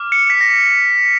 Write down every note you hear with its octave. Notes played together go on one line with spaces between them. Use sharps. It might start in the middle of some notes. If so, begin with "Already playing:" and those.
Already playing: D6 F6
C#7
B6
A#6